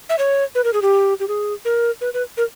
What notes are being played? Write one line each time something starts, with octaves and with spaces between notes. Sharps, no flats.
E5
C#5
B4
A#4
G#4
G4
G4
G#4
A#4
B4
B4
A#4